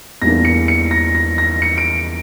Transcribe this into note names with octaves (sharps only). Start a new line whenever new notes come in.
E2 E3 G3 A#3 D4 A#6
C#7
C#7
A#6
A#6
A#6
C#7
D7